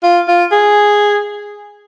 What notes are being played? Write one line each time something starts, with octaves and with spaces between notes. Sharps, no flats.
F4
F4
G#4